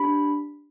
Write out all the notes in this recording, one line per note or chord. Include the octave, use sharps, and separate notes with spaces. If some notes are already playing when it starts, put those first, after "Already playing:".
Already playing: D4 G4 B5